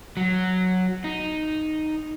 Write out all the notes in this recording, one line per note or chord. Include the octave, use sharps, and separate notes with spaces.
F#3
D#4